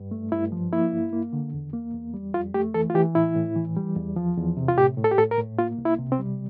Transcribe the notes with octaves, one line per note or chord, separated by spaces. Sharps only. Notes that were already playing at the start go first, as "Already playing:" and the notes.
Already playing: G2
A3
G2 E4
F3
A#3 E4
G2
A#3
D3
E2
A#3
E2
G3
F2 F4
A3 G4
E3 A4
F4
E3 G4
A2 E4
A2
E3
G3
E2
F3
E2
C3
F4
A2 G4
A2
A4
G4
A2 A4
A#4
A2
A#3 F4
C2
E4
C3
C4
G3